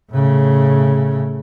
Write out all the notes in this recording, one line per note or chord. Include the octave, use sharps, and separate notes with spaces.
A2 C#3